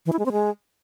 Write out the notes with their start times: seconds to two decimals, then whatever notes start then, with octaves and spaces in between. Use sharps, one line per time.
0.06 E3
0.13 E4
0.19 G#3
0.26 C4
0.32 G#3